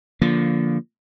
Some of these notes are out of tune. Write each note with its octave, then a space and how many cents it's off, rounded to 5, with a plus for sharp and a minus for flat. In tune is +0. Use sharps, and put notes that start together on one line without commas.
D3 -25 F3 -10 A#3 +0